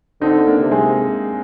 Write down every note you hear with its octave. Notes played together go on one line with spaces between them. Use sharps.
D3 C4 D#4
A#3 D4
C3
G#3 C4